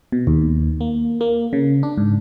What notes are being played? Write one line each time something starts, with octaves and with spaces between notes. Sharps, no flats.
B2
D#2
A#3
A#3
C#3
D4
G#2